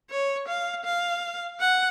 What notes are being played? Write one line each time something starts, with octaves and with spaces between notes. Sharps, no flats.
C#5
F5
F5
F#5